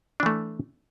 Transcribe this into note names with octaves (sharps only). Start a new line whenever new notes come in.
E3 A3 D4